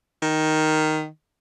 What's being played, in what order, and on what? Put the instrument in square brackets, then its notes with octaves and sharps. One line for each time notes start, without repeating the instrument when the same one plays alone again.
[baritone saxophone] D#3